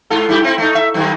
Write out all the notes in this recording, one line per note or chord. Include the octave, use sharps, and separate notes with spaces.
G#2 F4 A4
G2 E4 G4
A3 C4 E4
A3 D#4
E5
F#2 D#3